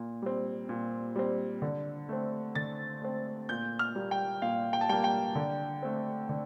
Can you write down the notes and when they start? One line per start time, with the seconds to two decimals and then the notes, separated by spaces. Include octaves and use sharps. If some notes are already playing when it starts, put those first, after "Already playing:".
Already playing: A#2
0.22 G3 C4
0.69 A#2
1.15 G3 C4
1.62 D3
2.09 A3 C4
2.55 D3 A6
3.02 A3 C4
3.49 A#2 G6
3.79 F6
3.95 G3 A#3
4.11 G5
4.42 A#2 F5
4.73 G5
4.81 A5
4.89 G3 A#3 G5
5.04 G5
5.35 D3
5.83 A3 C4
6.29 D3